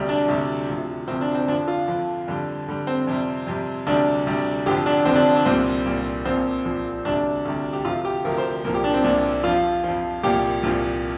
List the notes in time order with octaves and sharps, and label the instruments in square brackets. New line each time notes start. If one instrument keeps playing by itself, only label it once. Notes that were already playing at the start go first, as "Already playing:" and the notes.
Already playing: [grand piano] D2 C3 G3
D4
D2 C3 G3
D2 C3 F3
D2 C3 F3 C4
D4
C4
F2 D3 F3 D4
F4
F2 D3 F3
F2 D3 G3
F2 D3 G3
C4
F2 C3 G3
F2 C3 G3
D2 C3 G3 D4
D2 C3 G3
F1 F2 D3 F3 G4
D4
F1 F2 D3 F3 C4
D4
D4
C2 A#2 G3 C4
C2 A#2 G3
A#1 A#2 F3 C4
A#1 A#2 F3
D2 C3 G3 D4
D2 C3 G3
G4
D2 C3 F3 F4
G4
D2 C3 F3 A#4
C5
C2 A#2 F3 A#4
G4
D4
C4
C2 A#2 F3 D4
F2 F3 F4
F2 F3
C2 A#2 F3 G4
C2 A#2 F3